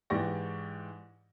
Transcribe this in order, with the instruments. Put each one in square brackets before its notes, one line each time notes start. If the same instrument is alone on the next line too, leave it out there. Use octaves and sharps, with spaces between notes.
[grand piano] G#2 E3 G4 D5 C#6 A#6